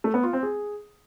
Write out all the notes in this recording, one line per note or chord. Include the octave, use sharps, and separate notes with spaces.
A3
B3
F4
C4
G#4